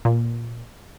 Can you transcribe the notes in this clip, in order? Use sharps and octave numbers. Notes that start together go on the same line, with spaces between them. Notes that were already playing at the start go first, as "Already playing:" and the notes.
A#2